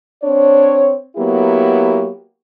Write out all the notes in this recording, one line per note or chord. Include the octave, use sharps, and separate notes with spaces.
C4 D4 C#5
F#3 A#3 B3 E4 G4